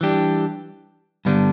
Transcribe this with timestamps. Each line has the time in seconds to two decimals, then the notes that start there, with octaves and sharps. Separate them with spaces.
0.01 E3 G3 D4 G4
1.25 G2 D3 G3 B3 D4